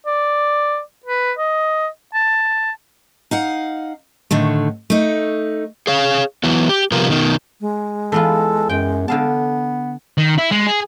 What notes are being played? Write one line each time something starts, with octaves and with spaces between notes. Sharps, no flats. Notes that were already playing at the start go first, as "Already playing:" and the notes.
D5
B4
D#5
A5
D#4 F5 F#5
A2 D3 D#3 A3
A3 D#4
G#4 C#5 F5
E3 F#3 B3
G4
C3 F3 G3 B3 F4 A#4
B2 D#3
G#3
E3 B3 F4 A4
F#2 G5
D3 B3 F5 A5
D#3
E4
G#3
G#4